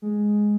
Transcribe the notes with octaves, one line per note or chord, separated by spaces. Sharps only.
G#3